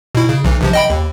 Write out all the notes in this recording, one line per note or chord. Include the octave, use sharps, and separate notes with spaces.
B2 E4
C#3
B1 E3
A#1 C3 F3
D#5 G5 B5
D#2